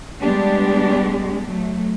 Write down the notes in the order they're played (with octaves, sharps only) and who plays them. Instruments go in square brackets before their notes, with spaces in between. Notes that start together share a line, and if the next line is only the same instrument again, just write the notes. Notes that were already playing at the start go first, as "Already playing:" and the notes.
[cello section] G3 G#3 B3 D4 G4
F#3 A3